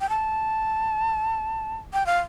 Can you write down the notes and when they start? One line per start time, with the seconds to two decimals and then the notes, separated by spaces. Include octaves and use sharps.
0.01 G5
0.09 A5
1.93 G5
2.06 F5